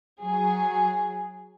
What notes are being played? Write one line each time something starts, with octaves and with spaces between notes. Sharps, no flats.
F#3 G#4